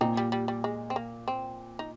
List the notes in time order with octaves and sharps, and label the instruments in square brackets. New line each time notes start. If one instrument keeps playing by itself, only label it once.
[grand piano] A#2 [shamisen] C4 D#4
[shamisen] G3
G3
G3
G#3
C4
A#3
C4
D#4